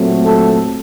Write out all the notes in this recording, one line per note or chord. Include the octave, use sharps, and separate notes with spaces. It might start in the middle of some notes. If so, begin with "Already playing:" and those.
Already playing: A#2 F#3 A3 C4
A4